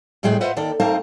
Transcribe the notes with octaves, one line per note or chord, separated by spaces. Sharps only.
E2 A2 G3 G#3 G#4 G5
F4 B4 C5 D#5 E5 F#5
D#2 D#3 A4 D5
A3 C4 D#4 A#4 F5 A5